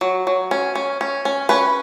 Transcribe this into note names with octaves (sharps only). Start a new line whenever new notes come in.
F#3
F#3
C#4
C#4
C#4
C#4
C#4 B4